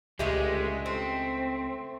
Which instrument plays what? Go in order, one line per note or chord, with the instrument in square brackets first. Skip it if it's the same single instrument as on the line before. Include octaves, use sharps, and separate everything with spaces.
[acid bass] C#2 [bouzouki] D3 A3 G4 [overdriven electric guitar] G#3
[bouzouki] A3 [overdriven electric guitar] C4